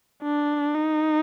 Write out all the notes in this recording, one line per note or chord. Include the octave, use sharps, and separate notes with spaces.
D4
D#4